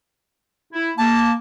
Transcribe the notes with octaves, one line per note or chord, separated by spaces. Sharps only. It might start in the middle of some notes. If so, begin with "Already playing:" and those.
E4
A#3 A5